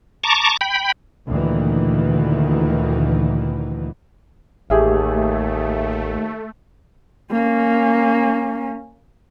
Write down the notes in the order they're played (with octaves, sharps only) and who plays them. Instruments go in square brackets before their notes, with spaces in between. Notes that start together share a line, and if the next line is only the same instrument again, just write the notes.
[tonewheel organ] A5 A#5 C#6 D6
G5 B5
[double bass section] D2 A#2 D#3 E3
[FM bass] A1 [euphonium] D#2 [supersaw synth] A3 [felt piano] G4 G#4 E5
[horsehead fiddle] A#3 C#4